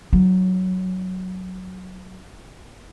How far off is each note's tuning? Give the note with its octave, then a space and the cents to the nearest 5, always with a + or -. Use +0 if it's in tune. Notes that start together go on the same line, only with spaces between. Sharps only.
F#3 +0 D#4 +0